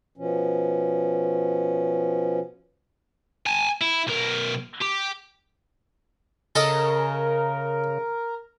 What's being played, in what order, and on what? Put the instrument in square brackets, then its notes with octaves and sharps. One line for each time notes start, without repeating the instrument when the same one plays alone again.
[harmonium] B2 F3 C#4
[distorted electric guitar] G#5 A5
E4
B1 A#4
G4
[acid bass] C#3 [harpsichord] A4 D#5 A5 [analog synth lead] A#4